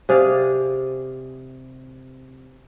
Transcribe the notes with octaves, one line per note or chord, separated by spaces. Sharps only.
C3 G#4 D5 F5